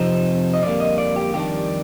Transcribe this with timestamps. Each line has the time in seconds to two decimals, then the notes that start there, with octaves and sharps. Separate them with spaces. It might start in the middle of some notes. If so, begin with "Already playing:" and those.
Already playing: F2 C3 F3 C4 D#4
0.53 D#5
0.62 F2 D3 G3 A#3 D5
0.80 D#5
0.98 D5
1.16 G4
1.34 F2 D#3 G3 D4 G4